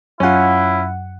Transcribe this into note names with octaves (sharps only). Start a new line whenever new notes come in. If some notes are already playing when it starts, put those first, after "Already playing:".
F#2 C#4 E4 F4 F#5